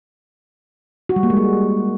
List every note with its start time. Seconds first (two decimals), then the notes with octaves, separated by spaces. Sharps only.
1.09 F#4
1.16 G3
1.23 A#3
1.30 G#3
1.37 G3